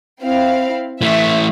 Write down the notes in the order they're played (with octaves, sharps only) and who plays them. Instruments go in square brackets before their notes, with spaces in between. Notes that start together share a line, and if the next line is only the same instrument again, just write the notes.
[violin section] C4 E4 F5
[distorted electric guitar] E3 A3 [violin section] E5